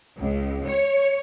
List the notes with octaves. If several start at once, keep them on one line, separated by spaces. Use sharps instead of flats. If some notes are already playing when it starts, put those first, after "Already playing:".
C#2
C#5